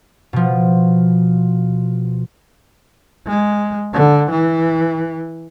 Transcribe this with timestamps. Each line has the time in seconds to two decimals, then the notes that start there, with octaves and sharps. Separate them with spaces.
0.33 B2 F3
3.26 G#3
3.94 D3
4.30 E3